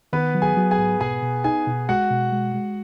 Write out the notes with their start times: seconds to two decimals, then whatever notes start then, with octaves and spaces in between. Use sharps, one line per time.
0.13 D#3 B3 B4
0.35 F#3
0.42 G#4 G#5
0.57 F#3
0.71 G#4 G#5
0.78 G#2
1.00 B2 G#4 G#5
1.23 B2
1.44 D#4 G#4 G#5
1.67 B2
1.89 G#3 F#4 F#5
2.10 B2
2.32 G#3
2.54 G#3